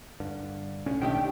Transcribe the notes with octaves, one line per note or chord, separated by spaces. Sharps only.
G2 D3
B1 A2 D3 C#4
D#3 D4 G4 E5 G5